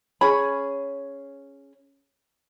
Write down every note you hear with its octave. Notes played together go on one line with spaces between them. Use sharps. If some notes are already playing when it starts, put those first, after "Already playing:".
C#4 G#4 B5